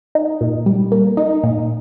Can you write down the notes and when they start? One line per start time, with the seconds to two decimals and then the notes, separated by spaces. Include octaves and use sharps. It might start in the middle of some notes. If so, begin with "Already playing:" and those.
0.15 D#4
0.41 A#2
0.66 G3
0.92 A#3
1.17 D#4
1.43 A#2